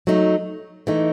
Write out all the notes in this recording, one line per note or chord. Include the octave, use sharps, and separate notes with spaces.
F#3 A3 D#4
E3 A3 D#4